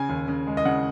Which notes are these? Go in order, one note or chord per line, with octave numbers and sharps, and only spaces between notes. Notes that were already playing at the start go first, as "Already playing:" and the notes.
Already playing: C#3 G#5
D#2
C#3
G#3
D#5
C#3 F#5